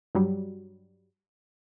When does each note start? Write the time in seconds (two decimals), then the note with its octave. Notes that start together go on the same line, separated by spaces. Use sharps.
0.15 G2 F#3 G3